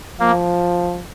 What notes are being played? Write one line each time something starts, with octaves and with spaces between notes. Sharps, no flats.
F3 A#3